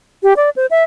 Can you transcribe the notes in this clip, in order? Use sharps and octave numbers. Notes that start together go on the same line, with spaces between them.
G4
D5
C5
E5